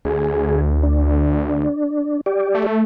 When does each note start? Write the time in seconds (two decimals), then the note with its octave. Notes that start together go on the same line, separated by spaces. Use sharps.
0.05 D2 G#4
0.83 D4
2.26 G4 D5
2.54 A3